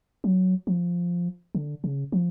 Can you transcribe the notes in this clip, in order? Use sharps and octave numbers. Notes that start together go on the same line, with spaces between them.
F#3
F3
D3
C#3
F3